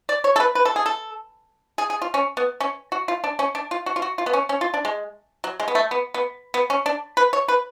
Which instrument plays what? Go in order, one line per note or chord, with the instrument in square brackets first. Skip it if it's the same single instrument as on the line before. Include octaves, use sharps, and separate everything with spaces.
[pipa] D5
C#5
A4
B4
B4
A4
G#4
A4
G#4
G#4
F4
C#4
B3
C#4
F#4
F4
D4
C#4
D4
F4
F#4
F4
F#4
F4
B3
C#4
C#4
F4
D4
G#3
F#3
G#3
B3
A3
B3
B3
B3
C#4
D4
B4
C#5
B4